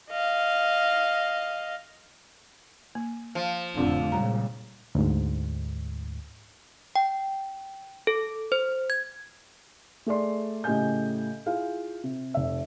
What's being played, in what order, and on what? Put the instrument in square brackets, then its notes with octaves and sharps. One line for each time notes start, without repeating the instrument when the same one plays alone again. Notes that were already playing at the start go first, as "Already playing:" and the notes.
[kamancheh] D#5 F5
[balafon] A#3
[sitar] F3
[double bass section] F1 A2 D3 [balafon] C4 D4 F4
[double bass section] A#2 C#3 G3 [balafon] G#3 A#5
[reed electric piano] D2 G#2
[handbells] G5
A4
C5
G#6
[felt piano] A3 G#4 D5 C6
A2 C#3 G4 D#5 G#5 G6
E4 F4 G#4 F5
C3
F1 E5